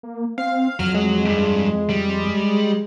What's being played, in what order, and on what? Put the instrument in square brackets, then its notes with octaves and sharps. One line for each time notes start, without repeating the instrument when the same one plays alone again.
[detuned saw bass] A#3
[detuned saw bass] C4 [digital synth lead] F5
[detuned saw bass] F2 [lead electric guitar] F#3 [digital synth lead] F6
[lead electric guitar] F#3 [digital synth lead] G#3
[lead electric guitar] E2 G2
G3